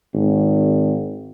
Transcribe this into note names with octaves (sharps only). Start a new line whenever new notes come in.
G#1